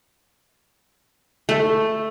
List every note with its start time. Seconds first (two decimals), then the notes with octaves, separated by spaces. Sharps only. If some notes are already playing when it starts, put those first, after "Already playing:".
1.49 A3